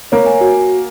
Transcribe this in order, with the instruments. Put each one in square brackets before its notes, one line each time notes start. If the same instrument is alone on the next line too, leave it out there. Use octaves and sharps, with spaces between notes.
[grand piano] A#3 [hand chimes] C#5
[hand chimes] G#5
F#4